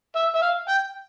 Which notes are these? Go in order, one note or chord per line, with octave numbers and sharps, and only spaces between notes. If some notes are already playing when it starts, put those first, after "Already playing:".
E5
E5
F5
G5